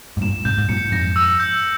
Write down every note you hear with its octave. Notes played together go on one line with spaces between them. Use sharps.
G#2
G2 A#2 E7
G#2 C3 G6
G#2
G2 A#2 C#7
F2 G#2 A#6
E6
G6